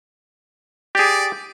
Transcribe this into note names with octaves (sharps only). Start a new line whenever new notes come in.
G4 G#4 D5